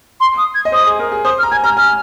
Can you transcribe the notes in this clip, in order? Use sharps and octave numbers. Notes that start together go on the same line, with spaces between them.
C6
D#6
G#6
D#5
C5 D#6
G#4
A#4
G#4
C5 D#6
F6
A#5
G#5 G#6
A#5 F6
G#5 F6